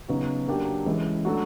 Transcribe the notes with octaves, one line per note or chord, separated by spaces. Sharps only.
C#3 F#3 B3 D#4 F#4
F#3 A#3 D4 G4
E3 G#3 C#4 E4
F#3 A3 D4 F#4